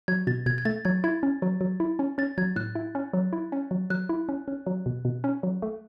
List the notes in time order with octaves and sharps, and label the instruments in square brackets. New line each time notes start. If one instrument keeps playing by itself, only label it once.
[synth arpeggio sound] F#3 [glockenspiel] G#6
[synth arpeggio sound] B2 [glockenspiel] A6
[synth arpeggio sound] B2 [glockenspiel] G#6
[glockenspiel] G#6
[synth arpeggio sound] A3 [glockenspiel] A6
[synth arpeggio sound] F#3 [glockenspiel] G#6
[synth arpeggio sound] E4 [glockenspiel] G#6
[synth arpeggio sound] C#4
F#3
F#3
E4
C#4
[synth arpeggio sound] C#4 [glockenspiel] A6
[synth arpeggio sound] F#3 [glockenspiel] G#6
[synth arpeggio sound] A2 [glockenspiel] F#6
[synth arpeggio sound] E4
C#4
F#3
E4
C#4
F#3
[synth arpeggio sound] F#3 [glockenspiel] F#6
[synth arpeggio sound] E4
C#4
C#4
F#3
B2
B2
C#4
F#3
A3